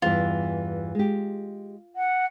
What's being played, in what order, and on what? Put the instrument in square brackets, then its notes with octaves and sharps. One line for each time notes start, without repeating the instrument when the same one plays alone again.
[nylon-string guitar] E2 G2 E3 [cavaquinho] F4
[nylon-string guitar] G#3 G4
[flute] F#5